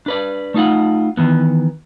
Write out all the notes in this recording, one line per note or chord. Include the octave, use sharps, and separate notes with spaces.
D4 B4 D5
A3 D#4 F4 F#5
D#3 E3 B3